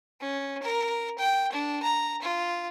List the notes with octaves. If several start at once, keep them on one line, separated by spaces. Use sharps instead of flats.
C#4
A#4
G5
D4
A#5
F4